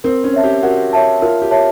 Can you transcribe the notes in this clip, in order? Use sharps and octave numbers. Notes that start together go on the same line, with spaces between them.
C4 A#4
C#4
C#5 E5 A5
G4
F#4 A#4
C#5 E5 A5
F4 A#4
G4
C#5 E5 A5